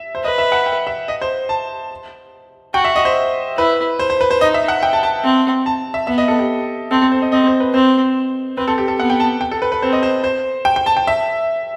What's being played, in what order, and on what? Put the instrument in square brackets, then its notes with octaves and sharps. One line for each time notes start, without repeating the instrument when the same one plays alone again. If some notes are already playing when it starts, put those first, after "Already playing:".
Already playing: [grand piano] E5
C5
[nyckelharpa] B4 [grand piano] D#5
[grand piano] E5
F#5
G5
E5
D#5
C5
A5
[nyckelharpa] F#4 [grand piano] G5
[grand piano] E5
D#5
C5
[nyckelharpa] E4 [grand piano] B4
[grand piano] C5
C5
B4
C5
[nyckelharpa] D#4 [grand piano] D#5
[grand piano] E5
F#5
G5
A5
A5
[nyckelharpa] C4
[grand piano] A5
E5
[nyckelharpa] B3 [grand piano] E5
[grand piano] D#5
A4
G4
[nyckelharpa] C4 [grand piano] A4
[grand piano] A4
C5
D#5
[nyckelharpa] C4 [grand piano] D#5
[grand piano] C5
B4
[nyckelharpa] C4 [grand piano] C5
[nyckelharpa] C4 [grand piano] B4
[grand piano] A4
G4
A4
[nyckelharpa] B3 [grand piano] F#5
[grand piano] G5
A5
G5
A4
B4
B4
[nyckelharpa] C4 [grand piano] C5
[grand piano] D#5
C5
C5
G5
G5
A5
G5
E5